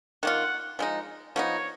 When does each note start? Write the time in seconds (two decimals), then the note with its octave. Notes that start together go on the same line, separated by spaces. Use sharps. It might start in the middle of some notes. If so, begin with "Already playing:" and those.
0.23 D#3 A#3 F4 F#5
0.79 F3 G#3 D#4
1.36 F3 B3 D#4 C#5